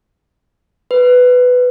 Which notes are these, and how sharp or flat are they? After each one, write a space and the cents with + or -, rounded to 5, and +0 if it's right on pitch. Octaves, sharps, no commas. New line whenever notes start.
B4 +10